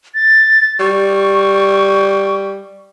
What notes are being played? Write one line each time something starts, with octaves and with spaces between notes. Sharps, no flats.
A6
G3 C#6